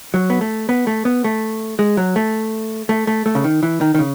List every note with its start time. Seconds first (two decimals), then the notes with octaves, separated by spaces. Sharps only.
0.14 F#3
0.30 B3
0.41 A3
0.69 B3
0.87 A3
1.05 B3
1.24 A3
1.79 G#3
1.97 F#3
2.16 A3
2.89 A3
3.07 A3
3.26 A3
3.35 C#3
3.44 D#3
3.63 E3
3.81 D#3
3.94 D#3
3.99 C#3